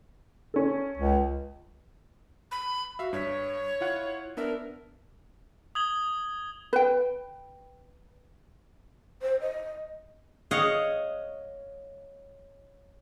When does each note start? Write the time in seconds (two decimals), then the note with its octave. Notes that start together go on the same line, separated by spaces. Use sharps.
0.54 C#4 A4
0.98 C#2
2.51 B5
2.99 F#4 E5 F5
3.13 G2 C#5 B6
3.81 E4 F4 F#5
4.37 B3 D4 A#4 E5
5.75 D#6 G#6 F#7 G7
6.73 B4 G5
9.22 C5
9.41 D#5
10.51 C#5 D#5 F5 F#5